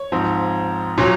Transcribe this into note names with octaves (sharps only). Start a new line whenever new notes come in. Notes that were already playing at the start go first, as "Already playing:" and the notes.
Already playing: C#5
G#2 F3 C4
A#2 F#3 C#4